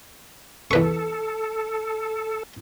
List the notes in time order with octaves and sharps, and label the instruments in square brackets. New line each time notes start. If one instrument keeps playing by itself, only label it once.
[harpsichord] E2 B4 C#6 [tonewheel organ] A4